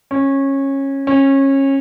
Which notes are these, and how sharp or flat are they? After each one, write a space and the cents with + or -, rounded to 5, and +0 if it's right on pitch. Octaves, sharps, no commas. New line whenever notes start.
C#4 -20
C#4 -25